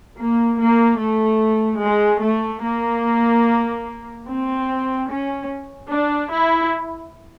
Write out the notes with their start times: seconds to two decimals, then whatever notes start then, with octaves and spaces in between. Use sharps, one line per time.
0.19 A#3
0.60 A#3
1.00 A3
1.82 G#3
2.23 A3
2.63 A#3
4.27 C4
5.09 C#4
5.91 D4
6.31 E4